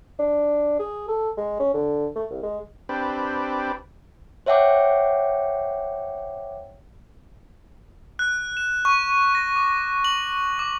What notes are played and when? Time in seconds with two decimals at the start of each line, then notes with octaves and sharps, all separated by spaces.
0.19 D4
0.79 G#4
1.08 A4
1.37 G#3
1.60 C#4
1.74 D3
2.15 A3
2.30 C2
2.43 G#3
2.89 C4 D4 G4 B4
4.46 C5 C#5 E5 F#5 G5 D6
8.19 F#6
8.57 E7
8.85 C#6
9.35 A#6
9.56 D6
10.04 F#7
10.59 D6